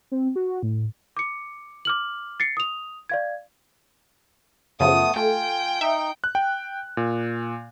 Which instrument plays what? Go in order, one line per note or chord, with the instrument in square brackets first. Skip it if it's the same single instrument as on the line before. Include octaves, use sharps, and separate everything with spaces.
[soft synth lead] C4
F#4
A2
[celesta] D6 C#7
D6 F6 F#7
A6 C7 C#7
D#6 F7
D5 F5 G#6
[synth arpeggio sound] F#2 C#3 F3 [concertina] A3 B3 [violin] D#6
[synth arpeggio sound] A3 [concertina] F4 G#5 [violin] G5
[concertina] D#4 [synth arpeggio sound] E5
[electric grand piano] F#6
G5
A#2